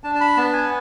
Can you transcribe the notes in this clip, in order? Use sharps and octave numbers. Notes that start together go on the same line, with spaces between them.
D4 A5
A5
B5
B3 A5
G#5